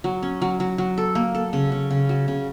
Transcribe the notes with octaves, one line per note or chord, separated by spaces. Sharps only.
F#3
C#4
F#3
F#3
F#3
A4
A#3
A4
C#3
C#3
C#3
F#3
C#3